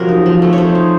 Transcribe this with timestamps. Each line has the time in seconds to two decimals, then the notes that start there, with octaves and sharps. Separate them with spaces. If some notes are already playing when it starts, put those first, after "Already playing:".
Already playing: C3 F3 F#3 C4 A#4
0.09 D#4
0.26 F3
0.42 A3
0.53 C#5
0.58 F3 C5
0.75 D#4